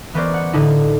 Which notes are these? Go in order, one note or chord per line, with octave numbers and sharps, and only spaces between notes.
E3 B3 C#4 A#4 C5 D5
F#5
A2 D3 D#4 E4